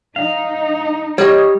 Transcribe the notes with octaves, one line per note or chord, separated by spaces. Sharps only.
D#4 F5
G3 C#5 D#5